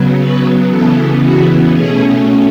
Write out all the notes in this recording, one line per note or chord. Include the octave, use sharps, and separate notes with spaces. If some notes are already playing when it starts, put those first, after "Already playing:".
Already playing: C#3 F#3 B3
B4
C#3 E3 B3 A4
F#4
B2 A3 C#4 G#4